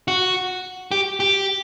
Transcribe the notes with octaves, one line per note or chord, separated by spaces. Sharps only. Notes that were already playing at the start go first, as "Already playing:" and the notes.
F#4
G4
G4